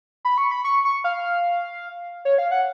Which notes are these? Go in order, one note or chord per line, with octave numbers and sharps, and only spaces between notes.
B5
C#6
B5
C#6
C#6
F5
C#5
F5
F#5